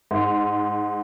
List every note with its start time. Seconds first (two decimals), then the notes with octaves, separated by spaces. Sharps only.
0.11 G#2